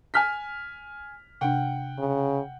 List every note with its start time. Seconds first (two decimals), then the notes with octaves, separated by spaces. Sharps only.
0.14 G#5 F6 B6
1.41 C3 D4 F#5 G5
1.98 C#3